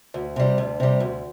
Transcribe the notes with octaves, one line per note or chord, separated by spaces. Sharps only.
D2
C3 G3
D2
C3 G3
D2